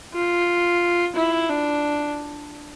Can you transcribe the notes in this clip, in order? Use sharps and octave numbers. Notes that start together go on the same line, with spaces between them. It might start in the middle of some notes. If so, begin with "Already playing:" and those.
F4
E4
D4